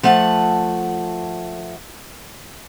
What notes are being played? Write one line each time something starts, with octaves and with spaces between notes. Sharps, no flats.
F3 A3 F#5 A5